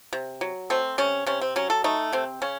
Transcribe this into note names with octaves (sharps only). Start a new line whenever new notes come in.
C3
F#3
A3 C4
C3 C#4
C3 C#4
C4
F#3 C#4
A4
A3 D#4
C3 C4
C#3 C#4